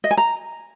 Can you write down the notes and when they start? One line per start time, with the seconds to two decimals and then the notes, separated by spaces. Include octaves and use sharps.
0.04 D#5
0.11 G#5
0.17 A#5